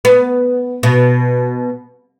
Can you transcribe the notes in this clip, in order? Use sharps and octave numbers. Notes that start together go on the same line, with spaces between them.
B3
B2